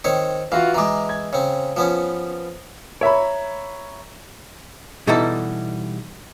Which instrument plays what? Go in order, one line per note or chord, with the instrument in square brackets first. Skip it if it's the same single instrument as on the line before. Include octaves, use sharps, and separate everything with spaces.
[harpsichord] D#3 C4 C#5
[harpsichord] E3 [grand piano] F4 F#4 F5
[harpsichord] E3 G#3 [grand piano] A#5 D6
[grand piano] G#6
[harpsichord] C#3 C4
F3 B3 C#4
[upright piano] C#5 E5 A#5 B5
[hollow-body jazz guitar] B2 E3 G3 D#4 E4 A4